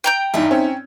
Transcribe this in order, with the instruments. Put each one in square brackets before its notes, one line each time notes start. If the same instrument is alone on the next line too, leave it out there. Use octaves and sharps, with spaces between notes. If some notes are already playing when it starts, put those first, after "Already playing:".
[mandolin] G5 A#5 G6
[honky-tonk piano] E2 G2 [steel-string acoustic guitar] D#4 E5
[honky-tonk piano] C4 C#4